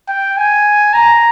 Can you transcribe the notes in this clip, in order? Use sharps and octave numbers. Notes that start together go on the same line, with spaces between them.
G5
G#5
A#5